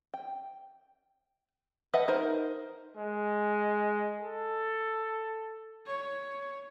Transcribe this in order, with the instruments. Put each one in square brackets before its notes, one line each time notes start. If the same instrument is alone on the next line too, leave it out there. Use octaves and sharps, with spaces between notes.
[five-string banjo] G5
B4 D#5 E5 F#5 A5
D#4 A#4 C5
[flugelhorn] G#3
A4
[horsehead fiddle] C#5